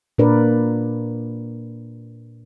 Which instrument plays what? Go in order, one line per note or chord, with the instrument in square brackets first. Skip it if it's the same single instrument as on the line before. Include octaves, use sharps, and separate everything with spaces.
[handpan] A#2 A#3 D4 A#4 B4 D5